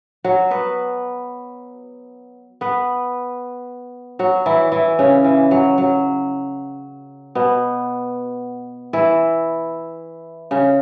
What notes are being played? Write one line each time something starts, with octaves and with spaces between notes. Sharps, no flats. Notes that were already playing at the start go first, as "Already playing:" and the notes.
F#3 F#4
B3 B4
B3 B4
F#3 F#4
E3 E4
E3 E4
C#3 C#4
E3
F#3
F#3
B2 B3
E3 E4
C#3 C#4